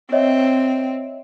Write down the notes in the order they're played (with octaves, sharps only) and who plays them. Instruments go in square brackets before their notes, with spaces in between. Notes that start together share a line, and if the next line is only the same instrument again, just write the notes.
[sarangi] C4 [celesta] C#5 D#5 E5